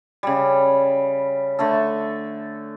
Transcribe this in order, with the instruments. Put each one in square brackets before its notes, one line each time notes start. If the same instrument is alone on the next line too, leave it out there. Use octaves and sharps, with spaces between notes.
[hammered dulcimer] C#3 G3
D3 A3 A4